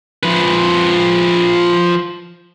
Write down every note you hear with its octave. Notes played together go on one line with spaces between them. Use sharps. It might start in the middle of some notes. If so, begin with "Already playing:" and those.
F3 B4